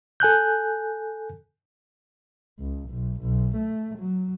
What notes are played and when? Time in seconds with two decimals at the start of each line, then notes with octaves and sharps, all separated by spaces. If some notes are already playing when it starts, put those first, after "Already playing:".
0.20 A4 G#5 F#6 G6
2.59 C#2
2.90 B1
3.22 B1
3.56 A3
3.98 F#3